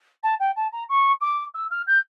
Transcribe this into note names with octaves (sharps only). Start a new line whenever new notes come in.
A5
G5
A5
A#5
C#6
D6
E6
F6
G6